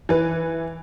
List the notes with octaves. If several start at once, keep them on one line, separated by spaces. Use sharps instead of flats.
E3 B4